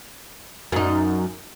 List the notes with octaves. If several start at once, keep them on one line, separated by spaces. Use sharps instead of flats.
F#2 D#4